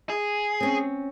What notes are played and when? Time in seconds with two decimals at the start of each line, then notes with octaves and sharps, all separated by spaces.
0.10 G#4
0.61 C4 C#4